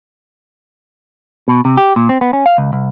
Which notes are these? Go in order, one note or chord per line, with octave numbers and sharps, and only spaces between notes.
B2
C3
G4
A#2
C4
B3
C#4
F5
C#2
C2